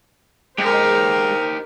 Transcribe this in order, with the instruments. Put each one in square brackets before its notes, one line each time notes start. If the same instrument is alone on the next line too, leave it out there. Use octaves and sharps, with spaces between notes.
[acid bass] G#3 [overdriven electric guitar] D#4 G4 [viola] A#4 C5